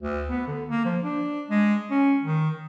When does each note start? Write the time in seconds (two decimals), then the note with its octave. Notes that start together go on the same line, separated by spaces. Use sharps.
0.02 D2
0.29 B3
0.47 D3
0.69 A#3
0.85 F3
1.02 D4
1.50 G#3
1.91 C#4
2.23 D#3